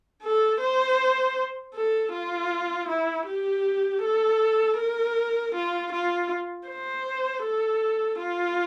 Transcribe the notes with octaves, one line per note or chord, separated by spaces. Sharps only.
A4
C5
A4
F4
E4
G4
A4
A#4
F4
F4
C5
A4
F4